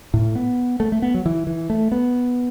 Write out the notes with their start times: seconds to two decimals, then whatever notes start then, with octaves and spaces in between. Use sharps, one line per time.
0.14 A2
0.35 B3
0.80 A3
0.92 A3
1.02 B3
1.14 F#3
1.26 E3
1.47 E3
1.70 A3
1.92 B3